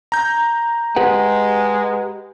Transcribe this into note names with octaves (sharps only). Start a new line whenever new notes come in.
A#5 G6
G#3 G4 B4 F#5